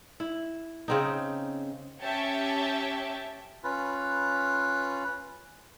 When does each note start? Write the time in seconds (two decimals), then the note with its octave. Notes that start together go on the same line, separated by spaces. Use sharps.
0.20 E4
0.88 C#3 C4 D#4
2.01 C#4 G4 C#5 E5 G5 A5
3.64 C#4 F4 B4